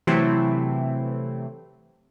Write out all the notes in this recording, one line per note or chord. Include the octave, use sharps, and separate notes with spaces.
C3 E3 F#3 A3 C4 E4